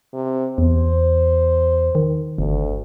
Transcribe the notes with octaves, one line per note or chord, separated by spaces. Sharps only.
C3
E2 C5
D#3
G1 D2